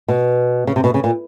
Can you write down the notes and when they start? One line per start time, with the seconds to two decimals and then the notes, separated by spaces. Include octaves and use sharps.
0.08 B2
0.67 C#3
0.76 C3
0.84 B2
0.94 C#3
1.04 A#2